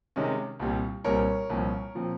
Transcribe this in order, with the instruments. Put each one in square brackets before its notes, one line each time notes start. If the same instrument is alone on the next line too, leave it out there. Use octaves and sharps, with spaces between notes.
[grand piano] C3 D#3 G#3 C#4
C2 A#2 G3 C4
C2 A#2 G3 C4 A#4 C#5
C2 A#2 F3 C4
A#2 F3 C4